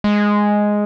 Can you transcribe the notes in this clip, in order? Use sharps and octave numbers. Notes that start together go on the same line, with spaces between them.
G#3